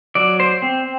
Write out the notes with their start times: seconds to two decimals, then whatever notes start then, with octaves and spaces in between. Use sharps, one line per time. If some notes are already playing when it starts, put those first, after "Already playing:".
0.15 F#3 D5
0.40 C5
0.62 C4